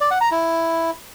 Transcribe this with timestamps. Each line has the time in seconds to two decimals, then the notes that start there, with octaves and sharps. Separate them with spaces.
0.01 D5
0.11 F#5
0.21 A#5
0.31 E4